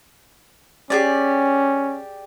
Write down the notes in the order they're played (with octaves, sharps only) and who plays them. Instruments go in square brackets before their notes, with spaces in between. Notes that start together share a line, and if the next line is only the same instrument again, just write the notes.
[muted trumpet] C#4 [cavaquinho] G4 G#4 D5